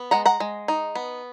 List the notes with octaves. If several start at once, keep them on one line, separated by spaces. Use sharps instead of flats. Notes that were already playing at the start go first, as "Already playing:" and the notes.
Already playing: B3
G#3 F#5 A#5
F#5 A#5
G#3
D#4
B3